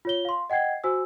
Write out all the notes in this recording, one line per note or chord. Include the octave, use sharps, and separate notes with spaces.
F4 C#5 G7
F5 C6
D#5 F#5 G5 G#6 C7
F#4 C5 G#5 E6